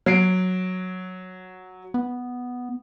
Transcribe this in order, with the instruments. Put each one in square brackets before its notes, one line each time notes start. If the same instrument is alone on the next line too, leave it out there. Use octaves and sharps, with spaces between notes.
[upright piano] F#3 C7 D7
[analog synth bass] B3